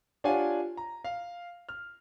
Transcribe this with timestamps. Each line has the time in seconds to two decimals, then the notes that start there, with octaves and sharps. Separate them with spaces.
0.24 D4 F4 G4 C#5 F#5 G#5
0.77 A#5
1.04 F5
1.69 F6